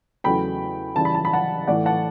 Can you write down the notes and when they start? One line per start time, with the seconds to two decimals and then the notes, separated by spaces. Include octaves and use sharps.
0.24 E2 C#3 F#3 A3 G5 B5
0.96 C#3 E3 G3 A5
1.05 B5
1.14 A5
1.25 B5
1.33 F#5 A5
1.67 A2 E3 A3 D5 F#5
1.86 F#5 A5